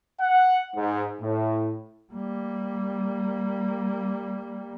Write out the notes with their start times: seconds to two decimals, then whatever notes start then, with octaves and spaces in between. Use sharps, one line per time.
0.21 F#5
0.76 G#2
1.22 A2
2.13 G3 A#3